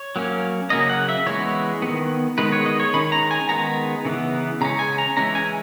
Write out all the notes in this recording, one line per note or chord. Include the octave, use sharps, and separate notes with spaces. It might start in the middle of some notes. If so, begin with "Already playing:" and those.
Already playing: C#5
F#3 A#3 C#4
C#3 F#3 A#3 C#4 D#5
F#5
E5
E3 G#3 B3 C#5
D#3 G#3 B3
D#3 G#3 B3 B4
C#5
D#5
C#5
D#3 G#3 C#4 B5
A#5
G#5
D#3 G#3 B3 A#5
C#3 E3 B3
C#3 G#3 C#4 A#5
G#5
A#5
E3 G#3 C#4 A#5
G#5